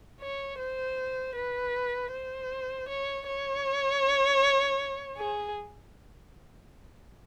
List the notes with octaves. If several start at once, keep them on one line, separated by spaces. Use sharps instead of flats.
C#5
C5
B4
C5
C#5
C#5
G#4